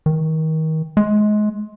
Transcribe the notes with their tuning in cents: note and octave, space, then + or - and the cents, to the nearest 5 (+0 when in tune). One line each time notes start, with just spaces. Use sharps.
D#3 +30
G#3 +25